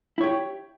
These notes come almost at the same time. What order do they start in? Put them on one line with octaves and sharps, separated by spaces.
E4 C#5 G4